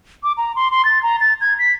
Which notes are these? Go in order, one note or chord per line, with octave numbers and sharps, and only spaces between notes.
D6
A#5
C6
C6
A6
A#5
A6
G#6
B6